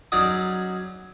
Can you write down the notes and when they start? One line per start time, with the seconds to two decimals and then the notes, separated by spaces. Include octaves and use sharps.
0.12 F#3 C#4 D#4 G#4 D5 D#5